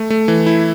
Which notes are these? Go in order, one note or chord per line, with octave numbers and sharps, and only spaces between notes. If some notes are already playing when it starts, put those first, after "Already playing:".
Already playing: A3
A3
E3
E4